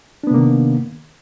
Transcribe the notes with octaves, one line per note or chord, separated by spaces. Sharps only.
C3 D#3 A#3 B3 D4